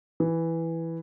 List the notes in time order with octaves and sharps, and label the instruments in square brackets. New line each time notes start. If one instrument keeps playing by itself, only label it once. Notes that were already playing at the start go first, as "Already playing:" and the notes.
[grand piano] E3